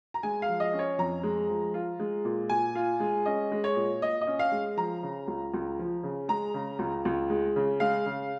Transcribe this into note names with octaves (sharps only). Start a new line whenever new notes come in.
A#5
G#3 G#5
F5
F3
D#5
C#4
C#5
F2 A#5
G#3
F3
F4
G#3
A#2
A#2 G#5
F4
G#3
C#4 D#5
G#3
C#5
A#2
A#2 D#5
D#5
C#4
F5
G#3
F3 A#5
C#3
C#2
C#2
F3
C#3
G#3 A#5
C#3
C#2
C#2
G#3
C#3
G#3 F5
C#3